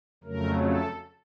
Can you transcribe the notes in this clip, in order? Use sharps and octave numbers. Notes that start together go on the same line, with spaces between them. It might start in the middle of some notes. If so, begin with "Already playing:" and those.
F2 C#3 F#3 A3 A#4
A4